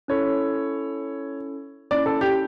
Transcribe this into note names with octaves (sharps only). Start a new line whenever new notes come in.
C#4 E4 A4 C#5
A#3 C#4 E4 D5
A4
G4